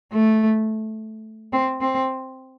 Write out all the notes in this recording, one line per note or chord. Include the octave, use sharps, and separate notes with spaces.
A3
C4
C4